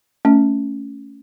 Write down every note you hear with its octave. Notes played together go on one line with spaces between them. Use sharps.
A3 C#4